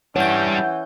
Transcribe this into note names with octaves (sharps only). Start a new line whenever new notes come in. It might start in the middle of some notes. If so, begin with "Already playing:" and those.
E3 G3 D4 C#5 F#5 G6